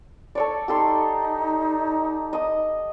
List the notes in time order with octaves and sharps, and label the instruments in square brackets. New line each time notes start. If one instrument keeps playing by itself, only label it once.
[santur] A4 C#5 D5
[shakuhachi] D#4 [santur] G4 A4 C6
[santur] D#5 D#6